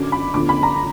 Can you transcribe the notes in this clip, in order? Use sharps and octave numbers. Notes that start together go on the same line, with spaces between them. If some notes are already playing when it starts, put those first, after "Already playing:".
Already playing: F#2 D3 F#3 D6
B5
D2 D3 F3 B3 D6
B5
A#5